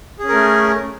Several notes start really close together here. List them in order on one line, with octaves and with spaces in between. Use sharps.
G#4 C#4 A#4 A3